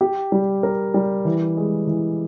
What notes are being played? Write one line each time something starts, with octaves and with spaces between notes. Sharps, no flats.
G4
G3
A#4
G3
E3
G#3
E3